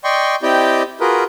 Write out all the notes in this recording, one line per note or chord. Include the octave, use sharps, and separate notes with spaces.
D5 D#5 G5 C6 C#6
C4 E4 G4 D5 D#5 G5
F4 F#4 G#4 A#4 B4